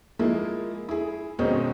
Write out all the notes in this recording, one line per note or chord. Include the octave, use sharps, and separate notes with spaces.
F3 G#3 A#3 D#4 E4
E4 G#4
G#2 B2 D#3 C4 C#4 D#4